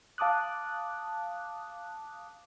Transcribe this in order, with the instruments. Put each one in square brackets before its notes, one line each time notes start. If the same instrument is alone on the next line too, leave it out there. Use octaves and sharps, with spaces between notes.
[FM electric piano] F5 A5 D6 D#6 F#6